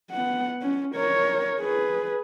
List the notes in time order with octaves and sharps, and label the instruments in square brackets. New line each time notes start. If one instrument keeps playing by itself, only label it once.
[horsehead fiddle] B3 F#5
C#4
A#4 C#5
G#4 B4